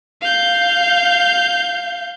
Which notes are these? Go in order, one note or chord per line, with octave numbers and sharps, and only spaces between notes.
F5 G6